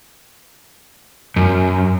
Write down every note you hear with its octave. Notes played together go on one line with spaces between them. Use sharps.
F#2